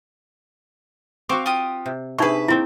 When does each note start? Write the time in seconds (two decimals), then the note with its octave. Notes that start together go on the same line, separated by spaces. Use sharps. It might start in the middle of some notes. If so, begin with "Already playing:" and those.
1.29 C4 F#4 F5 C#6 D6
1.46 F4 G4 D#6
1.86 C3
2.19 C3 D4 D#4 G#4 B4 E5 C#6
2.48 A#3 C4 D#4 E4